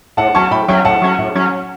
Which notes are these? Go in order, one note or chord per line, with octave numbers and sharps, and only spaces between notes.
A2 F#5 A5
F#3 C#4 A5 C#6
A2 G5 B5
F#3 C#4 E5 G5
A2 F#5 A5
F#3 C#4
A2
F#3 C#4